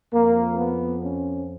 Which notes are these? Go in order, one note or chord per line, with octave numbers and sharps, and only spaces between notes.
F2 F3 A#3
B3
C#4